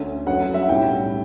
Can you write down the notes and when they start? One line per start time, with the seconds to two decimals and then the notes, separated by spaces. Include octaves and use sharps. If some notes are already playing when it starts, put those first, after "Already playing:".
Already playing: D2 D3 A3 C#4
0.27 G2 F#3 C#4 F#5
0.54 E5
0.62 F#5
0.69 B1 A2 G3 C#4 G5